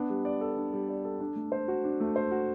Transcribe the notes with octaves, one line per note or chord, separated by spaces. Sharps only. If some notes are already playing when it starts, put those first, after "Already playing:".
Already playing: B3 D4
G3
D5
A4
D4
G3
D5
A4
D4
A3
C5
F#4
D4
A3
C5
F#4